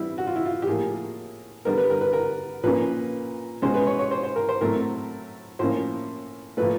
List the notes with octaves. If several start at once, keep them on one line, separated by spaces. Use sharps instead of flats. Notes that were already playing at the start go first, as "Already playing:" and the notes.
Already playing: E3 G3 C4 E4
F#4
F4
E4
F4
G4
A2 F3 A#3 G#4
D3 G3 B3 A#4
B4
A#4
B4
A#4
A#2 F3 A#3 C#4 B4
B2 G#3 C#4 C5
B4
C#5
C#5
C5
C5
A#4
C5
A2 F#3 A3 C4 A#4
A2 F3 A#3 C#4 C5
A#2 F3 A3 B4